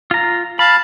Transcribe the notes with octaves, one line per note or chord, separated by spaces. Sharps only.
F4 A#5
F5 A5 B5